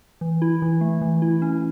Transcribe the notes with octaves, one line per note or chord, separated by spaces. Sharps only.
E3
E4
E3
A3
E3
E4
C#4